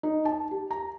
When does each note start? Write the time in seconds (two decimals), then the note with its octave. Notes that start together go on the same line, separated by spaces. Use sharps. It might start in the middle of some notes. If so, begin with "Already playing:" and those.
0.03 D#4
0.25 A5
0.51 G4
0.71 A#5